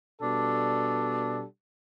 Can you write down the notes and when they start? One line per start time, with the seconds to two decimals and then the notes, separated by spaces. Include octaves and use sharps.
0.21 B2 G3 D4 A4